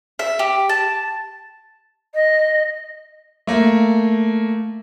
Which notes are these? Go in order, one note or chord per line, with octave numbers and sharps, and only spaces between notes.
E5
G4
A5
D#5
A3 A#3